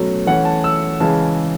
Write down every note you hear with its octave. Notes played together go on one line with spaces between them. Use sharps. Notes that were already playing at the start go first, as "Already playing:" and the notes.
Already playing: B2 F#3 A3 C#4
E3 A3 C#4 F#5
A5
E6
C#3 E3 G#3 C#4 A5